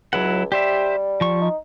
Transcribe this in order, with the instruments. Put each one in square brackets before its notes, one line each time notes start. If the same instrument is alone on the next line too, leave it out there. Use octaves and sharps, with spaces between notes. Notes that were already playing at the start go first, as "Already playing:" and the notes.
[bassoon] C#2 [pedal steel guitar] F#3 E4 F#5
[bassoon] G3 [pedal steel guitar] G4 C5 E5
[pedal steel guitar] F3 C#6
[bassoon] D#4